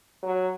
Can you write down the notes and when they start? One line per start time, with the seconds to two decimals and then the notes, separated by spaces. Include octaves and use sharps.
0.23 F#3